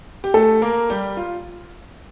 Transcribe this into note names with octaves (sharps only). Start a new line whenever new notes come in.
G4
A3 A4
A#3 A#4
G3 G4
F4